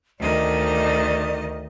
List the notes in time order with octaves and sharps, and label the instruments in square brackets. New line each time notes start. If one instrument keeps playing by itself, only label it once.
[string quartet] D2 D#3 D#5 [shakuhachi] D5